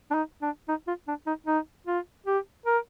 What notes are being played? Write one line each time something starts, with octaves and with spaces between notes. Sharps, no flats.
D4
D#4
D4
D#4
F4
D4
D#4
D#4
F4
G4
A#4